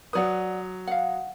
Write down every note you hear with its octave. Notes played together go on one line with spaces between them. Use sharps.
F#3 B4 D5 F#5 D#6
F5 F#5